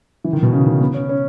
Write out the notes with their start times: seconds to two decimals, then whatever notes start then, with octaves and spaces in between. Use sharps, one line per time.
0.24 E3
0.33 D#3
0.43 B2
0.53 C#3
0.66 D#3
0.81 B3
0.94 C#4
1.09 C#4